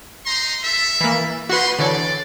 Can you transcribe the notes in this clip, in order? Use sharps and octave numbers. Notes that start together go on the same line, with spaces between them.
D#4 A#5 C6
A4 E5
E3 A#3
G#3 D#4 F#4 B4 C6
D3 E3 C#5 D5